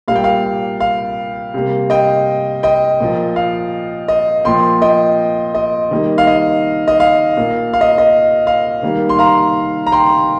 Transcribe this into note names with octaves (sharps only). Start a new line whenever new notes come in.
A#2 G3 A#3 F5
G5
F5
F5
C3 G3 A#3
D#5 G5
D#5 G5
A#2 F3 A#3
F5
D#5
A#2 F3 A#3 G5 C6
D#5 G5
D#5
D#3 G3 A#3
F5
D#5
D#5
F5
A#2 A#3
F5
D#5
D#5
F5
D#3 G3 A#3
C6
F5 A#5
A#5
G5 C6